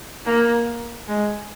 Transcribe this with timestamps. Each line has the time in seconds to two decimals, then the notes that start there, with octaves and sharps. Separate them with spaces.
0.25 A#3
1.08 G#3